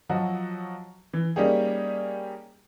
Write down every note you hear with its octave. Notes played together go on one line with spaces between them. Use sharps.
F3 F#3 F#4 D#5
E3
G3 A#3 C#4 D#4 G4 G#4